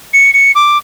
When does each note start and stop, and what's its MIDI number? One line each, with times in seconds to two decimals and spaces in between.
0.14 0.31 97
0.34 0.52 97
0.55 0.78 86